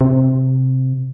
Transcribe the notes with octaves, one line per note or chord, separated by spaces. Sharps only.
C3